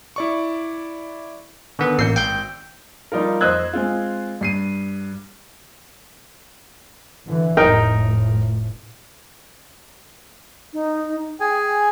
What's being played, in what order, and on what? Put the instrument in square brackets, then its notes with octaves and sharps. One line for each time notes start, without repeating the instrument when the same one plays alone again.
[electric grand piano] E4 D5 C#6
[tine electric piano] D3 D#3 B3
[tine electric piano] A1 A#3 C7 [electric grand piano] E6 G6 C#7
[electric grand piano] G#1 [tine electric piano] G5 G6
[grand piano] F3 G3 D#4 F4 A#4
F2 C5 D#5 E6 F#6 G#6
G#3 C4 F4
G2 C7 D#7
[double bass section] D3 E3
[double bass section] F1 A2 [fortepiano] D#4 A#4 G5
[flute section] D#4
[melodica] G#4 G#5 [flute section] G5